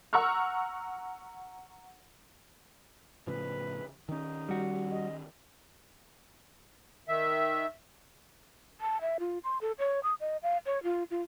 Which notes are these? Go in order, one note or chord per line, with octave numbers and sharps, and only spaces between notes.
F#5 A#5 C#6 E6 F6
A2 C#3 F3 B4
D#3 C#4 D#4
G3 F#4
D#5
D#3 E5
A5
E5
F4
C6
A4
C#5
D#6
D#5
F5
C#5
F4
F4